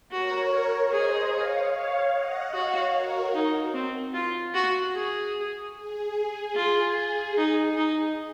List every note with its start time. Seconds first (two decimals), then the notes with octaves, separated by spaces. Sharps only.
0.10 F#4 A#4 C#5
0.91 G#4 C5 D#5
1.32 C#5 F5
1.73 C#5 F5
2.12 D#5 F#5
2.53 F#4 C#5 F5
2.93 F#4 A#4
3.34 D#4
3.74 C4
4.14 F4
4.54 F#4
4.95 G#4
5.75 G#4
6.55 F4
7.37 D#4
7.77 D#4